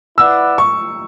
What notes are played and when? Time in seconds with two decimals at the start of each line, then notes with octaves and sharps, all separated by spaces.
0.17 E4 B4 D5 F#5 E6
0.58 C#6